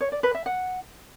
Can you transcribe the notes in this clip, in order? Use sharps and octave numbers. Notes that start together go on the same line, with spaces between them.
C#5
D5
B4
E5
F#5